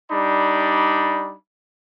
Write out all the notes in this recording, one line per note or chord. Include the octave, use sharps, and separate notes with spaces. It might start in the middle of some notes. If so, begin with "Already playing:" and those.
G3 D4 D#4 B5